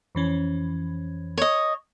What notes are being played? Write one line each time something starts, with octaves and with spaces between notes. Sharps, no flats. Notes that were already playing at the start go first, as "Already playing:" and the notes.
F2 E3 C#4
C#5 D#5